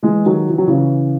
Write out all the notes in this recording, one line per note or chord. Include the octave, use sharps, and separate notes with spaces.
E3 G#3
D#3 F#3
E3
F#3
C#3 E3